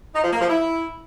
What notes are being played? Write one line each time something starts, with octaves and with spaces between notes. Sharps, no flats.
D#4
F3
A#3
F3
E4